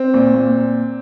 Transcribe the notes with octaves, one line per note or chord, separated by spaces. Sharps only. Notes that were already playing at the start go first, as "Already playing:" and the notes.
Already playing: C4
A#2
A#2